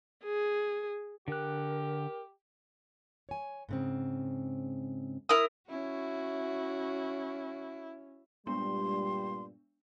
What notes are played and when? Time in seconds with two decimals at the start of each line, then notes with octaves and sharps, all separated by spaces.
0.24 G#4
1.28 D3 G4 A#4 F#6
3.29 C#5 G#5
3.69 G#2 C#3 C4
5.29 E4 A#4 D#6
5.70 C#4 E4 F#4
8.47 G2 A#2 G3 G#3 B3 D4 C6